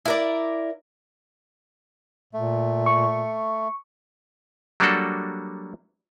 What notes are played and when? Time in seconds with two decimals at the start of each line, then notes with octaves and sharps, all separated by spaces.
0.06 E4 A#4 D5
2.33 A#2 A3
2.86 C#6
4.80 F#3 G3 A#3 D4 F#4 A4